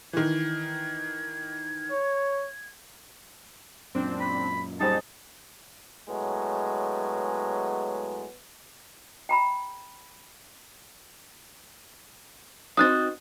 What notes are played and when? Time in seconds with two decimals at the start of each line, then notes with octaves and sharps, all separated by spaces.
0.13 D#3 E3 G#6
1.91 C#5
3.95 F#2 A#2 C4 D4
4.21 B5
4.80 G3 C4 D#4 G#4 A5
6.08 A2 F#3 G#3 B3
9.29 G5 A#5 B5
12.77 C4 D#4 F#4 D#6 F#6 A6